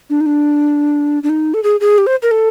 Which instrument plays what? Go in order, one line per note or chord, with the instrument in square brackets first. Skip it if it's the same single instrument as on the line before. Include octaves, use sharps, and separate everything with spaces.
[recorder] D4
D#4
D4
D4
D#4
A4
G#4
G#4
G4
C5
A#4
A4